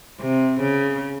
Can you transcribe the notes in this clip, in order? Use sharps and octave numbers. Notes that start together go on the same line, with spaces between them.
C3
C#3